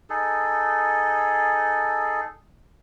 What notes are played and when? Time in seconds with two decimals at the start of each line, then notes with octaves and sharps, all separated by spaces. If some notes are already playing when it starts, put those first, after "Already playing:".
0.10 D#4 G#4 A4